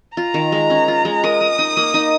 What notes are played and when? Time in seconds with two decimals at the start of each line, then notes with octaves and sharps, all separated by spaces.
0.16 F4 A#5
0.34 D#3
0.52 G#3
0.70 C#4
0.88 F4
1.05 G#3
1.24 A#4 D#6
1.41 A#4
1.59 D#4
1.77 A#3
1.94 D#4